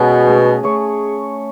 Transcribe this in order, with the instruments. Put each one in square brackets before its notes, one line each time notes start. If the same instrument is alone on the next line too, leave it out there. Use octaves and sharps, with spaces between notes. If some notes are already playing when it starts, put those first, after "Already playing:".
Already playing: [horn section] B2 [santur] G#3 C#4 G#4 D#5
[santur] A3 C#4 G#4 C#5
A3 C#4 G#4 C#5